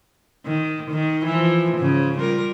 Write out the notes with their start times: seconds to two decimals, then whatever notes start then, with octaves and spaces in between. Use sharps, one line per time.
0.46 D#3
0.91 D#3
1.26 E3 F3
1.78 G#2 C#3
2.19 G3 F4 A#4